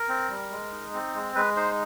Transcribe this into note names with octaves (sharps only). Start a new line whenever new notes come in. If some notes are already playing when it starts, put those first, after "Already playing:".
Already playing: A#4
C4
G3
G#3
D#4
C4
G#3
G#3 B4
D#4 C5